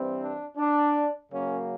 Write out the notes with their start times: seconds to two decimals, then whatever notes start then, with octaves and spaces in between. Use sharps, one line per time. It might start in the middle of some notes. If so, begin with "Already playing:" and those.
Already playing: G2 E3 G3 C4
0.20 D4
0.57 D4
1.32 F#2 C#3 F#3 A#3 C#4